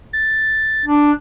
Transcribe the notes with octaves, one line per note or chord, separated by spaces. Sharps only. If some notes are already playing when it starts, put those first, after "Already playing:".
A6
D4